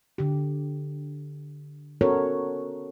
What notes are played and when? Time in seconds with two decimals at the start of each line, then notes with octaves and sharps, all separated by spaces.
0.18 D3 G4
2.01 B3 C#4 F#4 A4 A#4 C#5